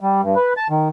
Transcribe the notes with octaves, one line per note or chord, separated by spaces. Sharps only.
G3
G2
B4
A5
D#3